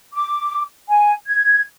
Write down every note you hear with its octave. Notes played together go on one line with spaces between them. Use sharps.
D6
G#5
G#6